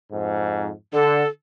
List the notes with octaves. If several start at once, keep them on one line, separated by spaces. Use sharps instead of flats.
F2 G#2
D3 A4